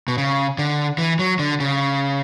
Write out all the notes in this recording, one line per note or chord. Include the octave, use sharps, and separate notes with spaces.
B2
C#3
D3
E3
F#3
D3
C#3